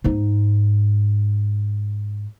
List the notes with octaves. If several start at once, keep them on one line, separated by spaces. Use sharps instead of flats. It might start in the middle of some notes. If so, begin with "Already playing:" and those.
G#2 D#4